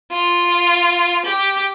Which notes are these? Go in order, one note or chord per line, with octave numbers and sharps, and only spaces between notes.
F4
G4